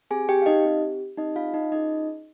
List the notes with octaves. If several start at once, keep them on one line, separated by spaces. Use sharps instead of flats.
C4 G4 G#4 G#5
G4 G5
F5
D#4 D#5
C4 G4
C4 D#4 G4 D#5
F4 F5
D#4 D#5
C#4 D#4 F4 G#4 D#5